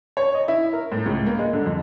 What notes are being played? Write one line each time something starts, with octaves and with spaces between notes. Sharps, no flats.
C#5
D#5
E4
A#4
A2
C#2
A#3
G#3
D3
F2